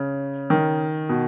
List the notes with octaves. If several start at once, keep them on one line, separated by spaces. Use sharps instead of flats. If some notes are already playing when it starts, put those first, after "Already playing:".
Already playing: C#3
D#3
B2